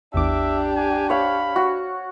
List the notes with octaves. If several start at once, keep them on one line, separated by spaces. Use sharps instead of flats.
A1 E2 D4 G4 E5 D6
G#5
C#5 F5 B5
F#4